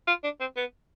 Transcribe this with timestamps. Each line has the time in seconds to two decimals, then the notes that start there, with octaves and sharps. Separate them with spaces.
0.07 F4
0.24 D4
0.40 C4
0.56 B3